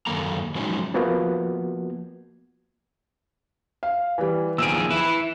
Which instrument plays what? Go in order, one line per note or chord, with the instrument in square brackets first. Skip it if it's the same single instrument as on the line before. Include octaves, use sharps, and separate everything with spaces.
[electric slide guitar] F#2 D3 D#3 A#3 A4 A#5
F3 F#3 G#3 C4 C#4 D#4
[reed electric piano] F3 A#3 B3 F#4
[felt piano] F5
E3 G3
[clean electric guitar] D#2 F3 G#4 [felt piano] E6 D7
[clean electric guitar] E4 B4